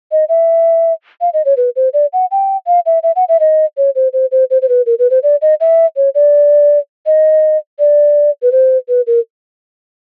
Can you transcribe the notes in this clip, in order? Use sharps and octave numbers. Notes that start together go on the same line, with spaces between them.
D#5
E5
F5
D#5
C#5
B4
C5
D5
F#5
G5
F5
E5
E5
F#5
E5
D#5
C#5
C5
C5
C5
C5
C5
B4
A#4
B4
C5
D5
D#5
E5
C#5
D5
D#5
D5
B4
C5
B4
A#4